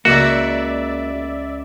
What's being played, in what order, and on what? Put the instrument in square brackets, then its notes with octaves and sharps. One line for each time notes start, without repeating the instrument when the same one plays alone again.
[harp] C#2 D6 [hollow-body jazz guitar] A#3 [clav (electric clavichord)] F#4 [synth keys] D5 E5